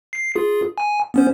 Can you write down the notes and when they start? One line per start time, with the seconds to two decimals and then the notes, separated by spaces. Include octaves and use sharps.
0.13 C7
0.35 F4 G#4
0.78 G#5
1.14 B3 C#4 C5